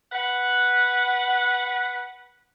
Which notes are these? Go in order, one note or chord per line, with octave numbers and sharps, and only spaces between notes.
B4 F#5